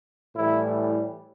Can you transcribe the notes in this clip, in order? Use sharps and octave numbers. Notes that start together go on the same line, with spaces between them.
A2 E3 G3 E4